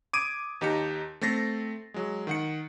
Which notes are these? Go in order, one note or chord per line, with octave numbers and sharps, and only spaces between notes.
D6 D#6 G#6 D7 D#7
D#2 D#4 G4 A#5 C#7
A3 C4 A6 A#6 C7
F#3 G#3
D#3 F#5 C#7